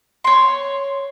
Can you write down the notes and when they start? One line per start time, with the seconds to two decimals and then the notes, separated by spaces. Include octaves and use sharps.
0.24 C#5 C6